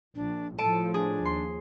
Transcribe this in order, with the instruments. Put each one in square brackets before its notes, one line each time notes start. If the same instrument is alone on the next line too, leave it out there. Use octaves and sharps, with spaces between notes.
[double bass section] A#1 [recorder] D4
[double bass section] A2 F3 [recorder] A4 [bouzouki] A5 [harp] D7 D#7
[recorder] D4 [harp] G#4
[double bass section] D#2 [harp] C6